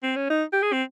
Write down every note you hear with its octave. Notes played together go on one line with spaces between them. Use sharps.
C4
C#4
D#4
G4
G#4
C4